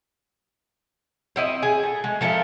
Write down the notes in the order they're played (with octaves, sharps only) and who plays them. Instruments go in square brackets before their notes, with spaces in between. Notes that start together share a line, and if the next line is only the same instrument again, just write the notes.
[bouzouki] C4 E4 D#5
G#4
A3
G#3
F3 A4 A#4 E5